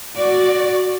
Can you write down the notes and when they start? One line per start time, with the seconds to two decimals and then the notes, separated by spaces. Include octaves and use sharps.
0.16 F#4 D5